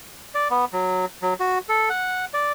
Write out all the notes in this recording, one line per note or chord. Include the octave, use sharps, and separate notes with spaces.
D5
B3
F#3
F#3
F#4
A4
F#5
D5